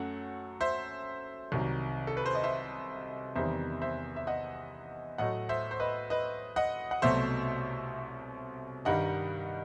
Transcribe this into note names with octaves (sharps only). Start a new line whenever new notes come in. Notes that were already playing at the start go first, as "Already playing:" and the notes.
Already playing: F#2 F#3 A3 F#5
C5 E5
C2 C3 D#3 F#3
A4
B4
C5
D#5
C5 E5
E2 C3 D#3 G3 C5 E5
C5 E5
E5
D#5 F#5
A2 F#3 A3 D#5 F#5
C5 E5
C5
B4 D#5
B4 D#5
D#5 F#5
F#5
C2 B2 F#3 A3 C5 E5
G2 D#3 G3 D#5 F#5